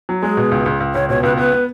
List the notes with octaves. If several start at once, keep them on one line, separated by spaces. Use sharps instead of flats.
F#3
G#3 G#4
B2
C#2
C#2
C#2
C#2 C#5
B2 C#5
C#2 B4
B3 B4
B3